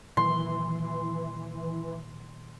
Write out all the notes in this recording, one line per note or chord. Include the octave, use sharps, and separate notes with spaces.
A#2 D#3 E3 F#3 C6